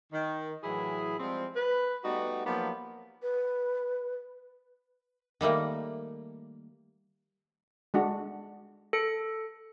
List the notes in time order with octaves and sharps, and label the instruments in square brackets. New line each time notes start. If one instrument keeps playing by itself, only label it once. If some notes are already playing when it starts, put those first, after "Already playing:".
[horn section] D#3
A2 E3 F#3 E4 G#4
F3 G3 G#3 C4
B4
G3 A3 B3 D#4 F#4
F3 F#3 A#3 B3 D#4 G4
[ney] B4
[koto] D#3 G3 A3 A#3
[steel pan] G#3 D4 F#4
[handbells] A4 C#7